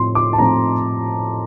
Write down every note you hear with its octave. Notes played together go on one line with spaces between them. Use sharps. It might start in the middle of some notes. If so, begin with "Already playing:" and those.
Already playing: A2 F3 C4 E4 C6
D6
A5
A2 F3 C4 E4 A#5